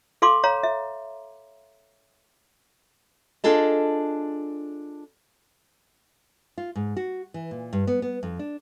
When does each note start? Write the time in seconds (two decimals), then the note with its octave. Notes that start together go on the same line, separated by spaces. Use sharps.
0.22 A4 F5 C6 D6
0.44 C#5 F5 A#5
0.63 E5
3.44 D4 F4 G#4 A4 D#5
6.58 F4
6.76 G#2
6.97 F#4
7.34 E3
7.51 A#2
7.73 G2
7.87 B3
8.02 B3
8.23 F2
8.39 D4